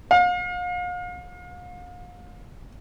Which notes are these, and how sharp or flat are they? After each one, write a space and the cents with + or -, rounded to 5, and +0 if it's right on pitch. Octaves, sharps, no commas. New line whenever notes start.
F5 +40